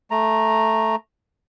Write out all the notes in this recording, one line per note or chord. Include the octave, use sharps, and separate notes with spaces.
A3 A#5